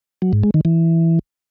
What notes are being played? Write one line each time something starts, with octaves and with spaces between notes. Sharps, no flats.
F#3
G#2
G#3
D#3
E3